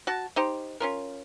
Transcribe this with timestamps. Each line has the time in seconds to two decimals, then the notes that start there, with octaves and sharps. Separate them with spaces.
0.07 F#4 A5
0.36 D#4 G4 C5
0.80 C#4 F4 A#4